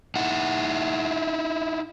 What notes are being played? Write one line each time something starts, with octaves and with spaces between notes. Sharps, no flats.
D#4 E4 F#5